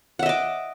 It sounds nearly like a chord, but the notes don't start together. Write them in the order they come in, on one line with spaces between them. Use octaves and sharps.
F#5 E5 D#5 D6